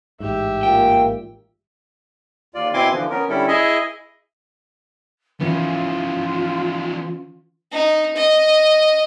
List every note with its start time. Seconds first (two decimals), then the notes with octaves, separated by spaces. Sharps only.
0.20 A1 G#2 G4 E5
0.63 A#2 G5
2.54 D#2 F4 D5
2.74 B2 C4 E4 G#5 C6 D6
2.93 D3 E3 F3
3.10 B3 C#4 A#4
3.29 D3 G3 C#4 E4 A4
3.48 E4 G#4 D#5 E5 G#5
5.40 E3 F3 B3 C#4 F4
7.72 D#4
8.16 D#5